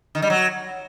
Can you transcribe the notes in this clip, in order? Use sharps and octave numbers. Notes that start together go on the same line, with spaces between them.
D#3
G3
F#3